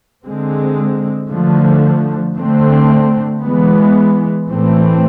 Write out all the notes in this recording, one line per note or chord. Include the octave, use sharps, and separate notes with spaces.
D3 G#3 C4
D3 F3 A3
D3 A3 C4
E3 G#3 B3
A2 E3 A3 C4